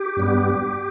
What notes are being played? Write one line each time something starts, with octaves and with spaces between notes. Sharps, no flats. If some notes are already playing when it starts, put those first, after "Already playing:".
Already playing: G4
G2 G3 B3